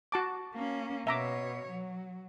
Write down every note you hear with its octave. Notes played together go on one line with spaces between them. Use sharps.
F#4 A5 D6
A#3 C#4
B2 C#5 E5 A#5 D6
F#3